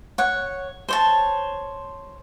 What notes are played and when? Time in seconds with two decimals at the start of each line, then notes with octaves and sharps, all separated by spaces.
0.18 C#5 F#5
0.88 C5 C#5 A5